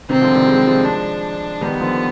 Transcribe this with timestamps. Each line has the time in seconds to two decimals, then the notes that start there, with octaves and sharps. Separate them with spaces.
0.09 C3 D#3 C4
0.21 D3 F3
0.35 D#3 G3
0.47 G#3
0.57 G3
0.67 F3 G#3
0.85 D4
1.61 D#3 G3 B3
1.80 D3 F3